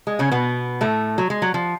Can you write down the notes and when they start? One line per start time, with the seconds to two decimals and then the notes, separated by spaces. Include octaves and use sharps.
0.07 G#3
0.19 C#3 C#4
0.32 B2 B3
0.81 A2 A3
1.18 F#3
1.30 G#3
1.42 F#3
1.54 F3